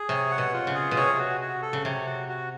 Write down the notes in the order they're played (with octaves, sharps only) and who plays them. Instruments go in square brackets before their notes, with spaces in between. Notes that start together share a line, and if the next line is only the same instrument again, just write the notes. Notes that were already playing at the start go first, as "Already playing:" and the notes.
Already playing: [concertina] G#4
[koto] C3 [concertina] C#5
[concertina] F#5
[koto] B2
[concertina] F4
[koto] C#3
[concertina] G#4
[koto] B2
[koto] C3 [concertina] C#5
[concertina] F#4
F#4
A4
[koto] C#3
[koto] C3 [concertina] C#5
[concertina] F#4
F#4